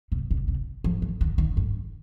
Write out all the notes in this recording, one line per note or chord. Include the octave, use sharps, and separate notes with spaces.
C3
C3
C3
F3
D#3
D#3
D#3
G2